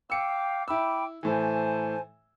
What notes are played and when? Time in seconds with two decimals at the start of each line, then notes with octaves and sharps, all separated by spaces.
0.10 F5 G5 D6 E6 C#7
0.68 E4 G5 B5 D6 E6
1.23 A2 E3 C5 G#5 A5